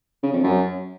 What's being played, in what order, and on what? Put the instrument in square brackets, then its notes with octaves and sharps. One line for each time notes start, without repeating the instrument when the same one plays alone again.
[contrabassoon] C#3
F2
F#2